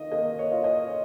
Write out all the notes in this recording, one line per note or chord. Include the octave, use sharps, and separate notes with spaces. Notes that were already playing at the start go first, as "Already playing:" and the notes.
Already playing: D#3 F4 D#5
A#3 D#5
C#5
F4
D#5